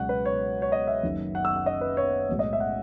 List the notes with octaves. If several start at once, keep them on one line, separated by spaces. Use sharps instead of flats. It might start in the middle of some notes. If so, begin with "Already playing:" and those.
Already playing: C#2 B2 F#3 F#5
B4
C#5
C#5
D#5
E5
F#1 F#2 D#3
F#5
E6
F#5
D#5
B4
C#5
B1 A2 G#3
D#5
E5
F#5